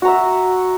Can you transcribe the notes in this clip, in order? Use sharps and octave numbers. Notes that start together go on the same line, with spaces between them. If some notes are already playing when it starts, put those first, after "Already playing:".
F#4 E5 A#5